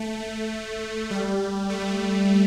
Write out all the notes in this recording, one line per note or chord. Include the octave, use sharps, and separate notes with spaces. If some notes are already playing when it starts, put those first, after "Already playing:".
Already playing: A3
G3
A3